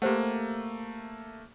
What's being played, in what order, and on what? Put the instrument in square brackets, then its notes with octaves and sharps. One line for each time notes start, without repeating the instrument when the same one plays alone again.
[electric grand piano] A3 A#3 [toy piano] G4 C5 F#5